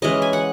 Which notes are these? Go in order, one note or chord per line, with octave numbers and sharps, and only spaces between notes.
E3 G#3 C#4 D#5
G#5
F#5